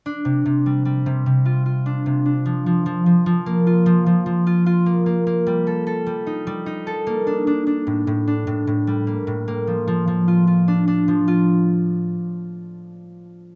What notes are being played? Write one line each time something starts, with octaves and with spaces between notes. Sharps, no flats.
D4
C3
C3
G3
G3
C3
C3
F4
F4
D4
C3
D4
F3
F3
F3
F3
F3
A#3
F4
F3
F3
F3
F4
F4
A#3
A#3
A#3
G3
A4
A4
G3
D#4
G3
D#4
A4
A#3
D4
D4
D4
A2
A2
D4
A2
A2
G3
A#3
A2
A#3
F3
F3
F3
F4
F4
D4
D4
F3
F4